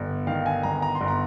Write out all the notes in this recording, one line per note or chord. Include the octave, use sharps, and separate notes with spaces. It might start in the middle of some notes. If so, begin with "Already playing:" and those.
Already playing: G1
D#3 F5
G#5
G1 A#5
A#5
C6
G1
A#5